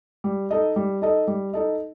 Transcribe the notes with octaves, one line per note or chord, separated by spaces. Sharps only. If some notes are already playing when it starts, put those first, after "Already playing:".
G3
D#4 A4 D#5
G3
D#4 A4 D#5
G3
D#4 A4 D#5